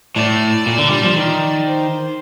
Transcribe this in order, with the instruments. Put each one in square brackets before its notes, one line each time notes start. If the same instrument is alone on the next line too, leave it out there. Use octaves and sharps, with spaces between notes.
[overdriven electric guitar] A2 [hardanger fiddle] D5
[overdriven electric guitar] A#2
D3
G3
F3
D#3
[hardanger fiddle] C5